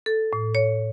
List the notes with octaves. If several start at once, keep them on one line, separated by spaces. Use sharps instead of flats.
A4
A2
C#5